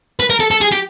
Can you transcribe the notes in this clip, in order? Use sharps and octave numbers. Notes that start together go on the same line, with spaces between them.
B4
A#4
A4
A4
G#4
G4